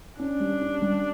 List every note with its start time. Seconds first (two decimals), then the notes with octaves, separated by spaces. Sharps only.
0.20 C#4 D4
0.40 G3
0.61 C#4
0.82 G3